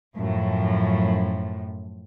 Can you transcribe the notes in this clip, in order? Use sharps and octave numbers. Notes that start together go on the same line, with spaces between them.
F#2 A2 F3